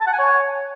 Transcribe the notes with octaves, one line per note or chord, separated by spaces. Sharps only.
A5
F#5
G#5
C#5